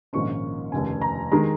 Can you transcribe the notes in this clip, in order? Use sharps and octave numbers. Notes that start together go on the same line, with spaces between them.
A#1 G#2 D#3 A#3 C#4 C#6
F1 D#2 C#3 G#5
A#5
D#3 G#3 A#5